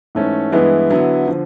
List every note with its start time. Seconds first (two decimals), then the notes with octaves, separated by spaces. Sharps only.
0.15 G#2 E3 A3 C#4
0.52 G2 E3 G#3 B3 E4
0.90 D3 F#3 B3 E4
1.28 D3 F3